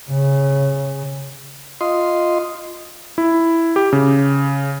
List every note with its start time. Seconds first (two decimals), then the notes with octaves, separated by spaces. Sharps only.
0.10 C#3
1.81 F4 D#5 C6
3.18 E4
3.76 G4
3.93 C#3